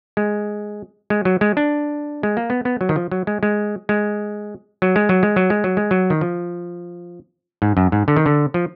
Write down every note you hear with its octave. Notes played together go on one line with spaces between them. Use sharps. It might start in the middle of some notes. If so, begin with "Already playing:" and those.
G#3
G#3
F#3
G#3
D4
G#3
A#3
B3
B3
F#3
D#3
F3
F#3
G#3
G#3
G#3
F#3
G#3
F#3
G#3
F#3
G#3
F#3
G#3
F#3
D#3
F3
G#2
F#2
G#2
D3
D#3
D3
F3